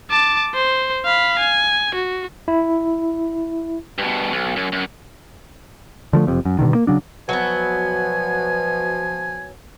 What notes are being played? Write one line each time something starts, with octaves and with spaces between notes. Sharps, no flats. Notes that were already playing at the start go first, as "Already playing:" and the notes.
A5 D6
C5
F5 B5
G#5
F#4
E4
G2 B2
B1
F#2
F#2
D3 F3 A3
F#1 F2 C3
F#2
G2 B2 D3 D#3
A#3
C#3 F#3 D4
B2 F3 F#3 B3 G#5